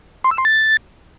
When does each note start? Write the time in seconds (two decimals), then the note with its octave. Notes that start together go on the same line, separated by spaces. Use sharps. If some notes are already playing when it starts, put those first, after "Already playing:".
0.24 C6
0.31 E6
0.38 C6
0.45 A6